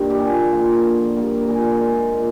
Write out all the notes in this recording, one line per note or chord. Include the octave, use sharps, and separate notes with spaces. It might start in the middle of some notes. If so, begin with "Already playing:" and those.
Already playing: G2 D#3 G3 A#3 A#4
G4
A#2 G#4
F3 A#3
D3
G3 A#3
A#4
A#2 G#4
G#3
A#2